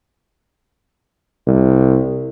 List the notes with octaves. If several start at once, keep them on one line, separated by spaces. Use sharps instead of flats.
C2